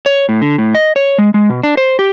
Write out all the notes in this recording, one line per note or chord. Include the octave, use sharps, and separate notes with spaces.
C#5
A2
D3
A2
D#5
C#5
G#3
G#3
B2
D4
C5
G4